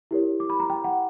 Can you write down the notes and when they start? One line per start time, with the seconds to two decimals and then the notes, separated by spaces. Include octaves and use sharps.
0.11 E4 G4 A#4 C#5
0.40 D6
0.50 B5
0.60 A#5
0.70 G5
0.84 F#5